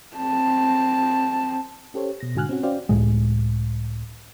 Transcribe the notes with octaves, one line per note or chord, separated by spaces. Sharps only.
C4 A5
C#4 G4 A4 C5 C#5
B2 A#6
G#2 D3 F#4 G#5 F6 F#6
C4 C#4 F#4
C#4 F#4 C5 D5 F5 G5
C#2 A2 G#3